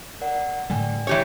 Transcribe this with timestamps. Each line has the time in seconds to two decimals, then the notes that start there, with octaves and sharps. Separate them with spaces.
0.21 A#4 D5 F#5
0.70 A2 D3 G3 D5 G5 G#5
1.07 E3 G4 C#5